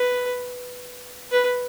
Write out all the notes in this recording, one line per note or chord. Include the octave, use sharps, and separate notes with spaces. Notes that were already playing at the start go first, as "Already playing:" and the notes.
Already playing: B4
B4